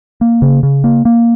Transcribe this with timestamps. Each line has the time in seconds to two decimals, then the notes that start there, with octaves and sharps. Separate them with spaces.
0.21 A#3
0.42 C#3
0.63 C#3
0.84 A#3
1.05 A#3